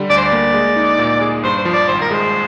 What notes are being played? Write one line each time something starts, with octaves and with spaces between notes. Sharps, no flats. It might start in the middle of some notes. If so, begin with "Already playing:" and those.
Already playing: D3 G3
D2 D5
C5
D5
A#3
G#3
D#4
A#2
G#4
G2 C5
C5
F3
D5
G#1 C5
A#4
G#3 C5